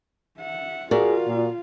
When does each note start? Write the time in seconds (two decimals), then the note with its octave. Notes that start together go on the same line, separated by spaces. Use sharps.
0.38 E5 F#5
0.91 F4 F#4 G#4 A#4 D5 F5
1.28 A#2